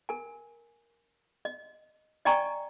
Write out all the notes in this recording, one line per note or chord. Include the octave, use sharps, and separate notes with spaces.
A#4 G#5
D#5
D5 D#5 G5 G#5 A#5 C#6